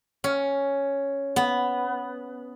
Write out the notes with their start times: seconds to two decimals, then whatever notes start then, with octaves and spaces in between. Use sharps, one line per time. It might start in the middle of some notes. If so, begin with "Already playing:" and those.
0.24 C#4
1.36 B3